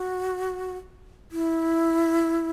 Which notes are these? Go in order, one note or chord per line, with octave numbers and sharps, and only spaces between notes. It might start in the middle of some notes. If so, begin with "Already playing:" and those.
Already playing: F#4
E4